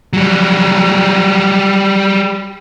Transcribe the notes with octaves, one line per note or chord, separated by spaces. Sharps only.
F#3 G3